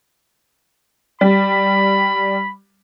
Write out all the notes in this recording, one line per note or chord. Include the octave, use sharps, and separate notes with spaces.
G3 B5